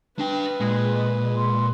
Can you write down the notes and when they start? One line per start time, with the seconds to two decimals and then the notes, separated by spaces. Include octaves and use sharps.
0.19 D4 B4 G5
0.60 A#2 G#3
1.37 C6